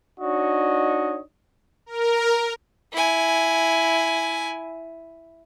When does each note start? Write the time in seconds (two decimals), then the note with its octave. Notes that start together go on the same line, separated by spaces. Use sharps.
0.20 D4 D#4 F#4 C#5 D#5
1.86 A#4
2.92 E4 G#5